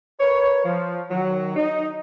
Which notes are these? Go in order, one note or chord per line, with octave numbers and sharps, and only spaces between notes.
A#4 B4 C#5
F3
D#3 F#3
D#4